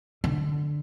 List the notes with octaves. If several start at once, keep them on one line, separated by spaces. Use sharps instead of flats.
D3